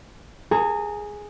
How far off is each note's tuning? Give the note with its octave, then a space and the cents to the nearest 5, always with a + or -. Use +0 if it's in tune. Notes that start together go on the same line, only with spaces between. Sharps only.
G#4 +0 A#5 -35